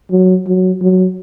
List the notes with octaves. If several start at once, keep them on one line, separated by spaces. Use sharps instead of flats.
F#3
F#3
F#3